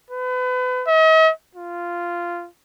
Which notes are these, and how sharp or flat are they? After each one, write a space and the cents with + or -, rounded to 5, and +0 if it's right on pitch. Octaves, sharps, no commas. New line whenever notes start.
B4 +35
D#5 +45
F4 -10